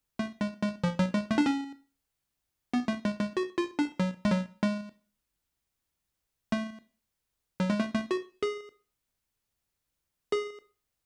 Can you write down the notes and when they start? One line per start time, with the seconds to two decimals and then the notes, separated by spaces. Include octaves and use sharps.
0.19 A3
0.41 G#3
0.62 G#3
0.84 F3
0.99 F#3
1.14 G#3
1.31 A3
1.38 D4
1.46 C#4
2.74 B3
2.88 A3
3.05 G#3
3.20 G#3
3.37 F#4
3.58 F4
3.79 D4
4.00 F#3
4.25 G#3
4.31 F#3
4.63 G#3
6.52 A3
7.60 F#3
7.70 G#3
7.80 A3
7.95 A3
8.11 F#4
8.43 G#4
10.32 G#4